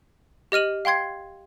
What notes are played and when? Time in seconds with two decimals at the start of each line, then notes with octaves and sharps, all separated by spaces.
0.52 G4 D#5 F6 D#7 F#7
0.85 F5 G5 C6 G#6 C7